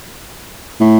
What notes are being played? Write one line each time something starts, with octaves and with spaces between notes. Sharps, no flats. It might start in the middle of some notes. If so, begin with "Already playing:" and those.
A2